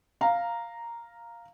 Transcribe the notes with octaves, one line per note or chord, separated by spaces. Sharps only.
F5 A#5